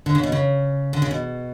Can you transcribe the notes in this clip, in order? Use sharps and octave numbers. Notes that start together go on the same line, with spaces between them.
D3
C#3
B2
C#3
D3
C#3
B2